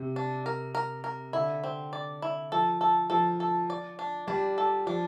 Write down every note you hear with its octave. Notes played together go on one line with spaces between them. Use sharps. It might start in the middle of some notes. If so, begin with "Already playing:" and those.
Already playing: C3
D4
A#4
A#4
A#4
D3 E4
C4
D5
E4
F3 A4
A4
F3 A4
A4
D5
D4
G3 D4
A4
F3 D4